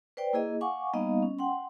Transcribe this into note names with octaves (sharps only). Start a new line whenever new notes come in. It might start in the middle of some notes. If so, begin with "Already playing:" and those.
B4 C5 D5 G5
A#3 E4 G#4 D#5
F5 F#5 G#5 C#6 D6
G3 A#3 B3 D#4 D#5 F5
C#4
F#5 G5 C6